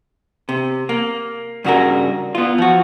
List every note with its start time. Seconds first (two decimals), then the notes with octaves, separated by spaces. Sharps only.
0.49 C3
0.89 A#3
1.64 G2 C#3 F#4 G4 A#4
2.35 B3 F4
2.58 F3 F#4